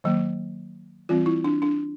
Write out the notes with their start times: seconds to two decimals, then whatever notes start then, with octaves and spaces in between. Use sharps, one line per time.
0.04 D#3 F#3 A#3
1.09 E3 G3 C4 F4
1.26 E4
1.44 D4
1.62 D4